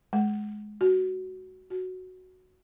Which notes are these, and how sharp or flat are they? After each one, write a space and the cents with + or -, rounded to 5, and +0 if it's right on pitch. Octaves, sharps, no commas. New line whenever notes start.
G#3 +15
F#4 +10
F#4 +0